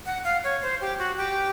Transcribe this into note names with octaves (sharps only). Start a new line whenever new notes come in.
F#5
F5
C#5
C5
G4
F#4
G4